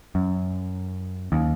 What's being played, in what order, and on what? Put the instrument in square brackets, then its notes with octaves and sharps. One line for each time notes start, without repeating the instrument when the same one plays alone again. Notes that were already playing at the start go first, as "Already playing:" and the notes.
[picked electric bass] F#2
D#2